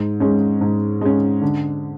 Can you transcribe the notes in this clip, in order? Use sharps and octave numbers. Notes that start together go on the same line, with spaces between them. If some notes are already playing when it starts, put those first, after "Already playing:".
Already playing: G#2
G#3 C#4
G#2
G#3 C#4
D3